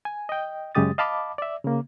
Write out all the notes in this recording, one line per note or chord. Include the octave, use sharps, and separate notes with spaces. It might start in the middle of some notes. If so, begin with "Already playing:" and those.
G#5
D#5 G5
F#2 C#3 G#3 G4 D#6 A6
D#5 F5 A5 B5 D6
D5 E5
C#3 A#3